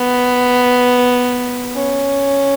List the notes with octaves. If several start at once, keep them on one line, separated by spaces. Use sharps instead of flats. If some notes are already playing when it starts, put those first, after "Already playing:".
Already playing: B3
C#4